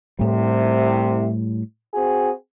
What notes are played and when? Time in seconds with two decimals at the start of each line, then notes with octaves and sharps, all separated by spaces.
0.19 C2 A2 C3 G3
1.94 C4 F#4 G#4